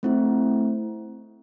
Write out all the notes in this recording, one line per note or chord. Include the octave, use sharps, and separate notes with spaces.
A3 C4 E4